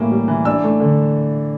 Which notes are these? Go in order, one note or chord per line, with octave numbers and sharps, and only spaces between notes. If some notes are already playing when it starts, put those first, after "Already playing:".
Already playing: A2 E3 G3 A#3
G3
E3
D4 E6
A3
D3